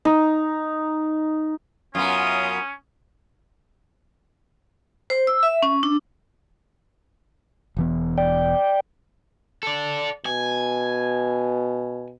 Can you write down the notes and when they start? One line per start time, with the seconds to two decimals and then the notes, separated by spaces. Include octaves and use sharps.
0.05 D#4
1.95 F#2 B3 C#4 F4 D#6
5.10 C5
5.27 E6
5.43 E5
5.63 C#4
5.83 D4
7.77 E1 E3 B3
8.18 D5 G5
9.63 A4 D5
10.26 B2 G#5